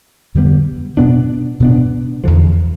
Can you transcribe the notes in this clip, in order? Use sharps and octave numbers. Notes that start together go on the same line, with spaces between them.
F2 D3 G3 B3
B2 B3 D4
B2 B3 D4
E2 D3 F3